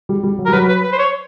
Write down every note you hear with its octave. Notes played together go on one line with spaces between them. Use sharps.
G3
G3
F#3
G3 A#4
F#3 B4
B4
B4
C5
C#5